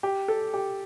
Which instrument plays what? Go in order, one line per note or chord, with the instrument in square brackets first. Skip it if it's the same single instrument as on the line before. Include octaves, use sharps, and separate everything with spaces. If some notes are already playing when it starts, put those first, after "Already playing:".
[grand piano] G4
A4
G4